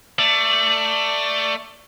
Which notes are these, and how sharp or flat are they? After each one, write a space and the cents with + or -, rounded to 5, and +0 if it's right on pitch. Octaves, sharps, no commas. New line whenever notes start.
A3 +20 D5 +0